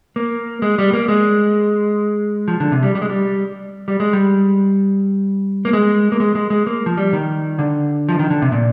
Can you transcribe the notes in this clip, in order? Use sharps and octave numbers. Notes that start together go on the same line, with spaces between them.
A#3
G#3
G3
A#3
G#3
F3
D3
C3
G3
G3
G#3
G3
G3
G#3
G3
A#3
G#3
A#3
G#3
G#3
G#3
A#3
F3
G3
D#3
D3
F3
D#3
D3
C3
A#2